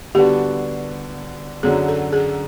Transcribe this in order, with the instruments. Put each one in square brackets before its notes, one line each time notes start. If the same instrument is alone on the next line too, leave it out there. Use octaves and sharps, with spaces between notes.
[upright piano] D3 G3 B3 D4 F#4 [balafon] G4
[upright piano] F#2 D3 F#3 [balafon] G#4
[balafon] A4
G#4